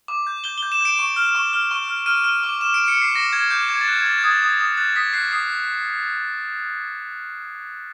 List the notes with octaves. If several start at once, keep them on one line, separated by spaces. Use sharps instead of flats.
D6
G6
G6 G7
G7
G6
E7
G6 D7
C#6
F6
C#6
F6
C#6
F6
F6 D#7
F6 D#7
D6
D6 E7
D7
D6
C#7
D6 C7
D6 A#6
D6 G#6
D6 G6
D6 G#6
A6
F#6
G#6
D6 A6
G#6
D#6
A6
D#6 G#6
D#6
F#6 A6
D#6 B6
F#6 C7
D#6 C7